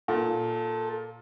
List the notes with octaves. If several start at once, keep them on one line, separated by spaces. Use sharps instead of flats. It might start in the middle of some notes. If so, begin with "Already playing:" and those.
A#2 A4